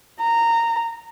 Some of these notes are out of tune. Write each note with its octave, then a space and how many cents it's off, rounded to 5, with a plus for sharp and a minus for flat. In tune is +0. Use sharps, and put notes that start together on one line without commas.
A#5 -15